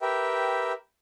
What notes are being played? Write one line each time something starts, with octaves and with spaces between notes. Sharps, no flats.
G4 A#4 B4 E5 G5